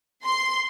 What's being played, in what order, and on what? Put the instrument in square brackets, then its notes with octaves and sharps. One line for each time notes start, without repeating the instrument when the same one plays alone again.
[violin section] C6